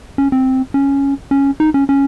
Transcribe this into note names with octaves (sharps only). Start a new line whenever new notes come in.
C#4
C4
C#4
C#4
D#4
C#4
C#4